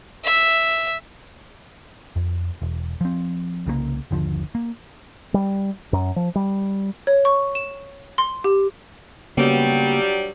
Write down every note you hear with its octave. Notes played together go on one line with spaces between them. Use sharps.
E5
F2
E1
F3 C4
C2 C#3 G3 A#3
G1 D#2 D3 F3
A#3
G3
F#2
F3
G3
C#5
C#6
E7
C6
G4
G2 C#3 F#3 G3 A#3 B3